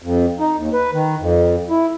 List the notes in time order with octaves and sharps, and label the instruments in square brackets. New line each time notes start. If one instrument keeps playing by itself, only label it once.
[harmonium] F2
D#4
D#2
B4
D#3
F2
E4